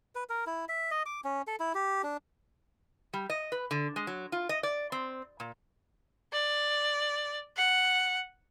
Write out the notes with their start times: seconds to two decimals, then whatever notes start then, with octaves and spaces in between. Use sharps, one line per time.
0.15 B4
0.29 A#4
0.47 E4
0.69 E5
0.91 D#5
1.06 D6
1.24 C#4
1.47 A4
1.60 E4
1.75 G4
2.04 D4
3.13 G3
3.30 D#5
3.52 B4
3.71 D3
3.96 G#3
4.07 F#3
4.32 F4
4.49 D#5
4.63 D5
4.92 C4
5.40 A#2
6.32 D5
7.57 F#5